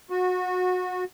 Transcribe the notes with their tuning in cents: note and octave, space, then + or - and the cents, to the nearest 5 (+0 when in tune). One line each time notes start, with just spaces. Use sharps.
F#4 -25